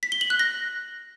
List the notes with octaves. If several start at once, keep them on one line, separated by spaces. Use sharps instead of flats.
B6
G7
F#7
F#6
A#6